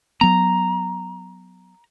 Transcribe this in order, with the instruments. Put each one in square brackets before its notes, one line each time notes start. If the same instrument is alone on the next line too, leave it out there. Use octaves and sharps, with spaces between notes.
[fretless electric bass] F#3 B3 [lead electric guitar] A#5